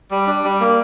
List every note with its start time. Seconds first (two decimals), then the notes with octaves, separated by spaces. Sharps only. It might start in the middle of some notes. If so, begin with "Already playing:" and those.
0.11 G3
0.27 D4
0.44 G3
0.60 A#3